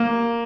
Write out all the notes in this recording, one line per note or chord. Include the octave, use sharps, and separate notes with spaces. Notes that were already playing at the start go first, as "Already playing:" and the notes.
Already playing: A#3